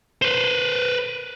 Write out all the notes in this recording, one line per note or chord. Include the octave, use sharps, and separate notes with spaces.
B4 C5